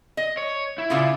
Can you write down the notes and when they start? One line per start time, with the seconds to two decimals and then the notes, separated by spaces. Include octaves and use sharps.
0.17 D#5
0.37 C#5
0.78 E4
0.90 A#2 C#3 F4